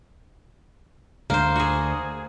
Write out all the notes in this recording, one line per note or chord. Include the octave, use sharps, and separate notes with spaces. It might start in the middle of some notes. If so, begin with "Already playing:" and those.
D2 A#3 C5
F#4 G#4